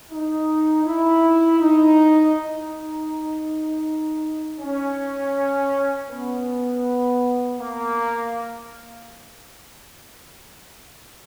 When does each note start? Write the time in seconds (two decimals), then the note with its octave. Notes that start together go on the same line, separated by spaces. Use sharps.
0.11 D#4
0.85 E4
1.60 D#4
2.34 D#4
4.59 C#4
6.09 B3
7.59 A#3